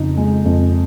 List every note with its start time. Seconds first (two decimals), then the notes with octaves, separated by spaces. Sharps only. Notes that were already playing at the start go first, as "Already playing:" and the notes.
Already playing: F2 C#3 D#4
0.17 G#3
0.45 F2